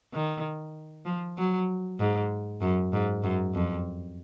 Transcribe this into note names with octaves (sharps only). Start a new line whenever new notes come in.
D#3
F3
F#3
G#2
F#2
G#2
F#2
F2